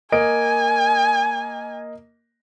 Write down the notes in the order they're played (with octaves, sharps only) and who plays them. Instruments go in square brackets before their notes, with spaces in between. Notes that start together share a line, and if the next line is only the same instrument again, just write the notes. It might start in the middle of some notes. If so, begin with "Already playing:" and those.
[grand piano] A#3 D#5 D7 [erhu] G#5